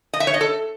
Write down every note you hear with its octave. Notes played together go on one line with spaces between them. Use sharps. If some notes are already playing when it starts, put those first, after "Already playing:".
D#5
E5
C#5
D#5
A4